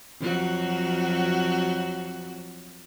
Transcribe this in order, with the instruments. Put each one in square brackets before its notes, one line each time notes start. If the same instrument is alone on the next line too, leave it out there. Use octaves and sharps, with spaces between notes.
[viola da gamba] F2 F#3 F#4